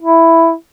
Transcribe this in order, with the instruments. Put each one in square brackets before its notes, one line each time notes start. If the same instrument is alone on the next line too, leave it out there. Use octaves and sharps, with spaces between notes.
[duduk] E4